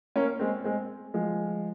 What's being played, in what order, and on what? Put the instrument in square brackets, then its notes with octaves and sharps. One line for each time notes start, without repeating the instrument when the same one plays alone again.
[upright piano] A#3 C#4
G#3 C4
G#3 C4
F3 G#3